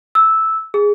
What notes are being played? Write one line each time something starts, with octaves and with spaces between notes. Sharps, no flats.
E6
G#4